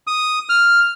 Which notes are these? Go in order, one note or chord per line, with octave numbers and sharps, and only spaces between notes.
D#6
F6